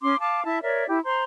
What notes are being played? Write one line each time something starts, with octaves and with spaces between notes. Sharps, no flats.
C#4 C6 D6
F5 A5 D6
E4 E5 A5
A#4 C#5 D5 E5
E4 G4
C5 A#5 C6